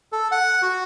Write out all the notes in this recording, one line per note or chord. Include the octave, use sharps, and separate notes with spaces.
A4
F#5
F#4